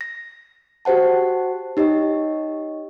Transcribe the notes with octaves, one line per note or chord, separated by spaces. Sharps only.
A#6
F#4 G4 C5 F#5 A5
D#4 G4 C#5 D#5